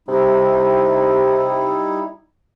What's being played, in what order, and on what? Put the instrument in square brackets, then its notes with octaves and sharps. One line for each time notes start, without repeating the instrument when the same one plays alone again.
[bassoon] C3 [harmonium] G3 D#4 E4